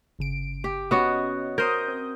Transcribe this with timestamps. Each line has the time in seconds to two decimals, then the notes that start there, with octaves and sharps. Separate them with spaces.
0.19 G1 C#3 D7
0.64 G4
0.91 B3 C#4 F#4 C#5 D#5
1.58 A#4 C5 D#6 G6
1.88 C4